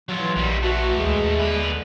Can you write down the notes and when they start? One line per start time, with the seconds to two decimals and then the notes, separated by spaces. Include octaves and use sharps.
0.09 E3 F#3 F4
0.36 A#1 D#3 G3
0.63 E3 A3 F#4
0.97 D2 G#3
1.16 D#2
1.40 D3 B4